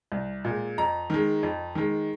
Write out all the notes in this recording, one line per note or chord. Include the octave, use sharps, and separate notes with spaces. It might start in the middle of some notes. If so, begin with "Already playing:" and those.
C2
A#2 G#3
F2 A#5
D#3 G#3
F2
D#3 G#3